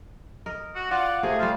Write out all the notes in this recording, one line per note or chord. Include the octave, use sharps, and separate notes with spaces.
A#4 D#5
F#4
F4 D5 F#5
C3 A3 G#4
G3 F4 C5